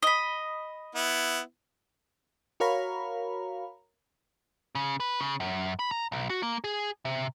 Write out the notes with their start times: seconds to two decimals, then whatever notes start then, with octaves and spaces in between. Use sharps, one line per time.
0.02 D#5 B5
0.95 B3 E4
2.60 F#4 A#4 C#5 F5 A#5 B5
4.75 C#3
5.00 B4
5.20 C#3
5.40 F#2
5.79 B5
5.91 A#5
6.12 B1
6.30 F#4
6.43 A#3
6.64 G#4
7.05 C3